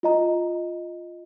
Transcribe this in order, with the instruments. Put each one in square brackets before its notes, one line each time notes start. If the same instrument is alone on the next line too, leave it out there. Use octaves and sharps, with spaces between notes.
[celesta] F4 D#5 A#5